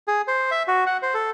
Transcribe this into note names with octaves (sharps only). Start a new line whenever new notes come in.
G#4
C5
E5
F#4
F#5
C5
A4